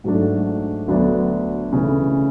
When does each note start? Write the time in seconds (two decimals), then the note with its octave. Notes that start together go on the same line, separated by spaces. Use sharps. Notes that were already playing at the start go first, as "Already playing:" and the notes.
0.04 G#2 F#3 A3 D4
0.88 D2 D3 F#3 B3 D4
1.73 C#3 E3 A3 C#4 E4